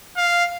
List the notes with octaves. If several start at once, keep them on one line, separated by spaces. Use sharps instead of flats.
F5